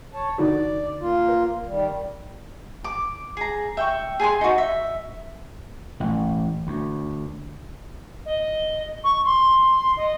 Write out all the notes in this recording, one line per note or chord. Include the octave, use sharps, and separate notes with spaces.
C#5 A5
D3 D#4 F#4 D5
A#3 F4
A#4
D#3 G3
D6
G#4 A#5
E5 G5 C#6
G#4 G#5 A5 C6
D#4 F#4
E5
A1
D2
D#5
C#6
C6
D#5